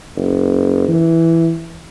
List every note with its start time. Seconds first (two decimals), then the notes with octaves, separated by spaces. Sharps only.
0.16 F#1
0.88 E3